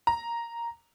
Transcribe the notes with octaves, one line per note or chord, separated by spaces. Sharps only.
A#5